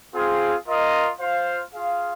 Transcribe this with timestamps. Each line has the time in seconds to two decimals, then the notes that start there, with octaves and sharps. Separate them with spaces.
0.12 C4 F4 G#4 F5
0.66 F4 A#4 D#5
1.19 F4 C5 F5
1.73 F4 G#4 F5